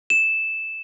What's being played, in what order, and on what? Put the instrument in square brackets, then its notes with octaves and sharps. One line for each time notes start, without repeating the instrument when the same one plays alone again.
[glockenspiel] E7